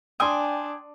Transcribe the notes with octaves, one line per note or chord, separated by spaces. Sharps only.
D4 G5 G#5 C6 D#6